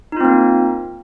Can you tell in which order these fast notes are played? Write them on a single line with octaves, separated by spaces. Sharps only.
D#4 F4 C4 A#3